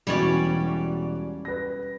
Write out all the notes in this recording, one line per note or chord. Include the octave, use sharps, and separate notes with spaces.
E1 E3 G3 C#4 F#4 D5
B4 A#6